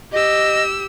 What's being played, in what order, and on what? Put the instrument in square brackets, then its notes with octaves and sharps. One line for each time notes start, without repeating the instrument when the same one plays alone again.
[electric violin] G4 E6 [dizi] D#5